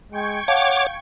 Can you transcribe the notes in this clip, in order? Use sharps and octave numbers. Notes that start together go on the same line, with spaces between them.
G#3 G5 C#6 G#6
C#5 F5 F#5 D6